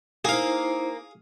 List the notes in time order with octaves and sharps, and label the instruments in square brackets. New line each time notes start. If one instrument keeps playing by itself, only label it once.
[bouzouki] A#3 [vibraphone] D#4 E4 C5 [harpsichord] G#4 F5